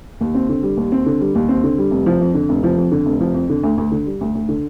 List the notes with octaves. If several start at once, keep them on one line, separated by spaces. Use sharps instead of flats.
D#2
C4
D3
G3
D#2
C4
D3
G3
D#2
C4
D3
G3
F1
F3
F2
D3
F1
F3
F2
D3
F1
F3
F2
D3
D2
D2
D3
G3
D2
D2
D3